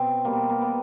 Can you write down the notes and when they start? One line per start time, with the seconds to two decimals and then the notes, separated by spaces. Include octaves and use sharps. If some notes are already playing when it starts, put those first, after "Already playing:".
Already playing: B2 C4
0.25 B2 G3 A#3
0.49 A#3
0.61 B3